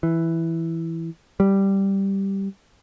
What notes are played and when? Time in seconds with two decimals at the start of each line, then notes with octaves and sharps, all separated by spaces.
0.03 E3
1.40 G3